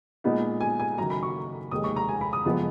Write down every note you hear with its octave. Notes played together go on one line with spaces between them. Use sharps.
A#2 G#3 B3 D#4
G#5
G#5
F#1 F#2 D#3 A#5
B5
C#6
F1 D#2 D#3 G#3 D#6
C#6
A#5
G#5
B5
D#6
F#1 F2 F3 G#3 B3